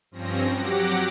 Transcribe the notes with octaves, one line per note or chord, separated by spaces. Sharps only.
G2 F3 C4 C#4 A#6
F#3 G4 F#5 D6 A#6